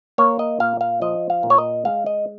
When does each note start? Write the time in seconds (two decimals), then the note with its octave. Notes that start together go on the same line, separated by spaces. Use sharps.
0.18 A#3 C#5
0.39 D#5
0.60 A#2 F5
0.81 F5
1.01 F3 D#5
1.30 F5
1.43 A#2
1.50 C#5
1.58 D#5
1.85 G#3 F5
2.06 D#5